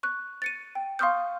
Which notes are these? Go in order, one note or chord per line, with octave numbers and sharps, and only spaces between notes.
C#6 F#6
A6 C#7 D#7
G5
F5 C6 C#6 D#6 F6 G6